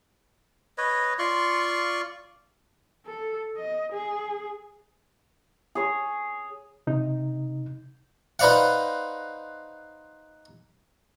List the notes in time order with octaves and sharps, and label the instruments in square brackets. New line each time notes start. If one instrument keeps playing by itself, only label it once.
[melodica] B4 C#5 D#5
F4 D5 C6 C#6
[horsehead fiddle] A4
D#5
G#4
[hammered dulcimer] G#4 C#5 C#6
[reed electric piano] C3 D#4
[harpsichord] D#4 B4 C5 D5 F5 F#5